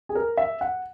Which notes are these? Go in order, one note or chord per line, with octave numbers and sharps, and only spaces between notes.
G#4
A#4
E5
F#5